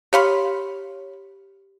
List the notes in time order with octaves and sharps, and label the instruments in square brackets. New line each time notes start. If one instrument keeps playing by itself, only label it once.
[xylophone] G4 C6 [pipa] C#5 F5 B5